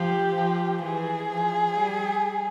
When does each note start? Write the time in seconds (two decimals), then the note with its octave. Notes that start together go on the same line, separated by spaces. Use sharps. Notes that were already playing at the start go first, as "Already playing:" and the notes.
Already playing: F3 G4
0.35 F3
0.82 E3 G#4
1.30 F3
1.77 G3